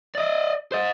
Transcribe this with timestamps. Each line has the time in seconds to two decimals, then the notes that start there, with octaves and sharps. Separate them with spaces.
0.15 D5 D#5
0.72 C5 D#5